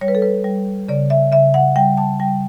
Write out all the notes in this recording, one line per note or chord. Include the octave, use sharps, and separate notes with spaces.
G3 C#5
B4
A4
B4
G3
C#3 D5
E5
C#3 E5
F#5
G3 G5
A5
G3 G5